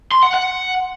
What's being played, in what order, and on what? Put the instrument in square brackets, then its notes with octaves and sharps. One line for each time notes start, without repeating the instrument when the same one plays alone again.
[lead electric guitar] C6
F#5
F#5